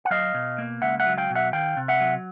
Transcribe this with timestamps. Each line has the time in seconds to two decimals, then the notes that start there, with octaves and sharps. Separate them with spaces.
0.05 F#5
0.11 F#3 D#5 F5
0.34 B2
0.58 A#3
0.82 C#2 E5 F#5
1.00 E5 F#5
1.06 F#3
1.18 F5 G5
1.30 B2
1.35 E5 F#5
1.53 D#3 F5 G5
1.77 C3
1.88 E5 F#5
2.00 F#3